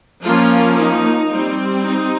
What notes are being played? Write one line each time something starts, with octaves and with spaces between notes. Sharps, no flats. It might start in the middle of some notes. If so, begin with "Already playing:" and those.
F3 A#3 C#4 F4
D#4
G3 C4
D#4